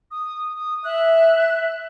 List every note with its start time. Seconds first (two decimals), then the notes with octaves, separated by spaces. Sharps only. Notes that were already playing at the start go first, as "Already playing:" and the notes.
0.11 D#6
0.56 D#6
0.84 E5 F#6